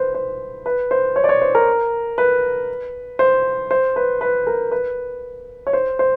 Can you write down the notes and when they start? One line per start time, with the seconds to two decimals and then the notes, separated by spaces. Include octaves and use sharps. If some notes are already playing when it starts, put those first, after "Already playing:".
Already playing: B4 C5
0.15 C5
0.66 B4
0.91 C5
1.16 C#5
1.24 D5
1.29 C#5
1.42 C5
1.55 A#4
2.18 B4
3.19 C5
3.71 C5
3.96 B4
4.21 B4
4.47 A#4
4.72 B4
5.67 C#5
5.73 C5
5.99 C5